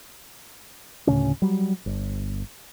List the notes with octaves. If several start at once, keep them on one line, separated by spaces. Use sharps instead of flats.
D2 A2 C#3 C#4
F#3 G3
G1